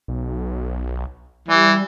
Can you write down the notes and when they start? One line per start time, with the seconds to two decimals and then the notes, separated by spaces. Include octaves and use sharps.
0.08 B1
1.48 E3 G3